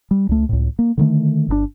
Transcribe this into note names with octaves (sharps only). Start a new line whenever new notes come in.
G3
C#2 A3
C#2 A2
A#3
D3 D#3 A3
G1 B2 D4